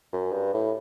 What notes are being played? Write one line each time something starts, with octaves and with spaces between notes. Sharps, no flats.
F#2
G2
A2